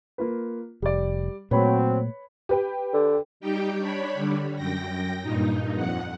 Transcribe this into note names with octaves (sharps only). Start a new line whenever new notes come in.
A#3 F4 B4
F1 G3 D5
A#2 F#3 A3 C4 B4 C#5 B5
G4 B4 G5
D3
G3 D#4 G4 G5
D4 C#5 B5
D3 G3
F#2 G5 A#6
G2 A#2 D#4
F2 F#5